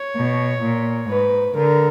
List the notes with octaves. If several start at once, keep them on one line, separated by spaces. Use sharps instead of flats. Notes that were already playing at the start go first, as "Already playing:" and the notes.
Already playing: C#5
B2
A#2
G#2 B4
D3 A#4